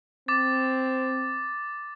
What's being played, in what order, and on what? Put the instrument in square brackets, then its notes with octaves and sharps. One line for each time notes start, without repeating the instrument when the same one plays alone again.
[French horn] C4 [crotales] D6 A6